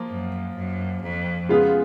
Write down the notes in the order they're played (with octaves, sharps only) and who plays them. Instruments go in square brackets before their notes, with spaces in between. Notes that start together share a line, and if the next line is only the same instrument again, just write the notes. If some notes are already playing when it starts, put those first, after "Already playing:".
Already playing: [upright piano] F3 A#3 F4
[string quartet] F#2
F#2
F2
[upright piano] C#3 G#3 B3 F4 G#4